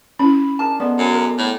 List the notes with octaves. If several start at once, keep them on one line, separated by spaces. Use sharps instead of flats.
C#4 E4 B5
D4 G#4 A#4 A5
D3 G#3 B3 D5
F#2
A#4
A2